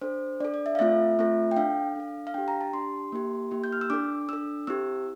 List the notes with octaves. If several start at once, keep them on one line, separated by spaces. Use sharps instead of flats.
D4 A4 C5
D4 A4 D5
D5
E5
F5
A3 C4 F4 A4 E5
A3 C4 F4 A4
G5
D4 A4 F5
D4 A4
F5
D4 G4 G5
A#5
A5
D4 G4 C6
A#3 E4 G4
A#3 E4 G4
G6
F6
E6
D4 A4 D6
D4 A4 E6
C4 E4 G4 E6